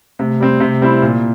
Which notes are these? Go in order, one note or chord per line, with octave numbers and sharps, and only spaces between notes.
C3 A3
G3 C4
C3
G3 C4 E4
A#2 A#3